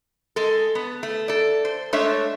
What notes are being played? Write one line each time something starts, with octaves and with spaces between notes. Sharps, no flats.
G#3 A4
B3
A3
A4 D5
C5
G#3 A3 D4 C#5 E5